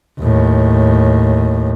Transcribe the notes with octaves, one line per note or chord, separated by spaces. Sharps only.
D#2 A2